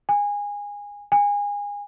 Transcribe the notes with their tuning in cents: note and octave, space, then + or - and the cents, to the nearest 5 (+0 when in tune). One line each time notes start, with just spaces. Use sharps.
G#5 -20
G#5 -25